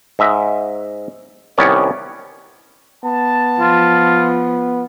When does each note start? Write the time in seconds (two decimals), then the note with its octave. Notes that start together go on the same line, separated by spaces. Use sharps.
0.19 G#2 D#5 E5
1.58 C2 D#3 B3 C#4 C#5 D5
3.04 B3 A5
3.60 F3 F4